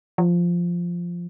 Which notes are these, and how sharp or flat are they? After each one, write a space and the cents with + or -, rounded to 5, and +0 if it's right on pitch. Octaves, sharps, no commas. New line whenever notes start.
F3 -5